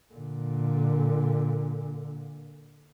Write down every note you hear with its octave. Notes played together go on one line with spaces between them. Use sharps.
A#2 D3